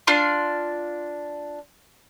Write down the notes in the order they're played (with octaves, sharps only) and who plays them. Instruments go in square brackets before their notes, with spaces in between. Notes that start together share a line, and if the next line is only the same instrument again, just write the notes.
[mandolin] D4 F4 C6